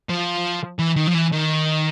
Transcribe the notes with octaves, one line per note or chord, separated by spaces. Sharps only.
F3
E3
D#3
F3
E3
D#3